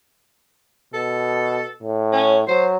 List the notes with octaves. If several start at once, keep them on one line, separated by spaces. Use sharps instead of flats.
B2 A4
A2
C#4
F#3 C5